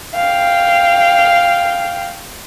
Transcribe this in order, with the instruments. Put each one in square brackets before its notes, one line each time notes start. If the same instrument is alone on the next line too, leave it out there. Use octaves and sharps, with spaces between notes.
[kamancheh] F5 G5